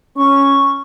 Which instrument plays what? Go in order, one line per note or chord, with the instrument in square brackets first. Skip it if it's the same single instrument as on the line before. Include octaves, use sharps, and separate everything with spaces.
[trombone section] C#4 [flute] C#6